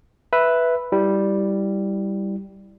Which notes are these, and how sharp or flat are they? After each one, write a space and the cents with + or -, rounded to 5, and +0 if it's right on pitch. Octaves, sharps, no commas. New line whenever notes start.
B4 +0 E5 +0
G3 +0 E4 +0